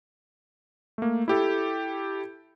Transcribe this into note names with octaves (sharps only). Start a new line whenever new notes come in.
A3 A#3
E4 G4 A4